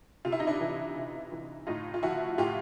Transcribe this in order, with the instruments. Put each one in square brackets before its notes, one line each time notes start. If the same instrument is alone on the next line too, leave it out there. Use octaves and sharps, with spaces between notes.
[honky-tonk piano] C3 F4
E4
D#4
D4 E4
E3
C3
E3
A2 D#4 F4
F4
F3 E4 F#4
A2 F4 G4